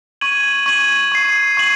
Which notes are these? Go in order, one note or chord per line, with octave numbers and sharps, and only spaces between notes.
C#6 G#6 D#7 F#7
C#6 G#6 D#7 F#7
C#6 G#6 C7 F#7
C#6 G#6 C7 F#7